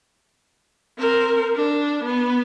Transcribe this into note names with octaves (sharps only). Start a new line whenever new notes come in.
C4 A#4
D4
B3